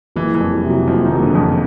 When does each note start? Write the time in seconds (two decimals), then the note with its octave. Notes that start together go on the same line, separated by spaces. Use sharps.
0.16 F#1 E3
0.34 E3
0.40 F2
0.52 G3
0.64 C3
0.70 F#3
0.88 F#1 F3
1.06 D#3
1.11 F#1
1.23 D3
1.35 F2
1.40 C#3